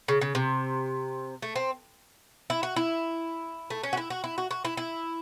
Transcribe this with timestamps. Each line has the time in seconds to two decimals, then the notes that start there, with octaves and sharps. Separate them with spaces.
0.08 C#3
0.21 C#3
0.35 C3
1.42 A3
1.56 C4
2.50 E4
2.63 F#4
2.76 E4
3.70 A3
3.83 C#4
3.93 F#4
3.97 E4
4.10 F#4
4.24 E4
4.38 F#4
4.51 F#4
4.65 E4
4.77 E4